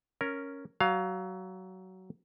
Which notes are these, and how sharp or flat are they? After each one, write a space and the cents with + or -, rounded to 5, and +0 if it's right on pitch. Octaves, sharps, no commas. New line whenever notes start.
C#4 +0 A#4 +0
F#3 +20 F5 +10